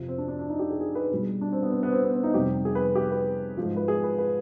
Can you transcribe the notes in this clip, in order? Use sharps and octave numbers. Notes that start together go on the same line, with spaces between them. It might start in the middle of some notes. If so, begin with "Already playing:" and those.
Already playing: F2 C3 F3
C4
D4
D4
D4
D#4
G4
G#4
G#4
B4
B2 G3
D4
C4
B3
C4
B3
C4
B3
C4
D#4
F2 C3 G3 G4
G#4
B4
G4
B4
G#2 F3
B4
G#4
B4
B4